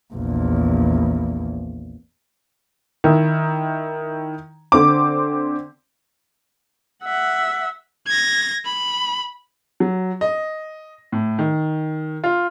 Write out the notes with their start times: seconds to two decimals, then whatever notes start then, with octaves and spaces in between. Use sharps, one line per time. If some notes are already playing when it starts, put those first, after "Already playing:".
0.14 A#1 E2
3.04 D#3 E4
4.72 D3 C4 D6
7.03 E5 F#5
8.06 G#6 A#6
8.65 B5
9.80 F#3
10.21 D#5
11.12 A2
11.39 D#3
12.24 F4